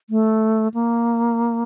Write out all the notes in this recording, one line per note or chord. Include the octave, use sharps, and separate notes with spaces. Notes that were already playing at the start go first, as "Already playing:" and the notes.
A3
A#3